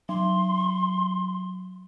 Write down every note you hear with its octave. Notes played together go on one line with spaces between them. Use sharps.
F#3 C6